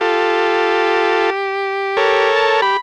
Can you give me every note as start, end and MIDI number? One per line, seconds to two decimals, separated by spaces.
0.01 1.30 65
0.01 2.29 67
0.01 1.30 69
1.97 2.61 69
1.97 2.61 70
1.97 2.61 73
2.36 2.57 81
2.62 2.77 67
2.62 2.78 83